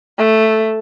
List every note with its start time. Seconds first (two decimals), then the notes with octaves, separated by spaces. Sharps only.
0.18 A3